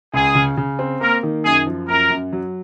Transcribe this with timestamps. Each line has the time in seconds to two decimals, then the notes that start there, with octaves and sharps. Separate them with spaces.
0.14 C#2 G#4
0.35 C#3
0.57 C#3
0.79 C4
1.01 A#3 A#4
1.23 D#3
1.45 F#2 G#4
1.66 F3
1.88 F#2 A#4
2.10 F#2
2.33 F#3